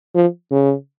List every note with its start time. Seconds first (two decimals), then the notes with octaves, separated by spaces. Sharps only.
0.15 F3
0.51 C#3